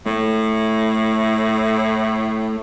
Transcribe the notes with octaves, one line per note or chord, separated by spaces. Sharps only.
A2 A3